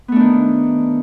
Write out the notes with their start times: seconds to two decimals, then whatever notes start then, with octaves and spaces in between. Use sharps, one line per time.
0.08 B3
0.12 A3
0.16 D4
0.20 D#3